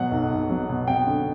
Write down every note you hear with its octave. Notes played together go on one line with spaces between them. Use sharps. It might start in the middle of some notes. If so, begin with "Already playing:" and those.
Already playing: B2 F#3 F#5
B1
B1
F#3
B2
F#3 G5
D3